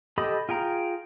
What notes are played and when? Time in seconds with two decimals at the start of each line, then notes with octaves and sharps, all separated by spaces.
0.18 G4 A4 D#5 B5 D#6
0.49 F4 G#4 G5 A#5